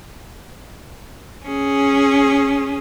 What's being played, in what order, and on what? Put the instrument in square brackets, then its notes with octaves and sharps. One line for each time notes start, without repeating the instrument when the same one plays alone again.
[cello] C#4 G#4